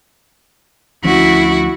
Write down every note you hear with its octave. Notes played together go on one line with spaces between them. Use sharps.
D2 F3 C#4 E4 F#4